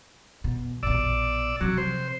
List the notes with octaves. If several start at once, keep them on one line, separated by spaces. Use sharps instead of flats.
B2
A#1 B2 D5 E6
C3 F3 F#3
C5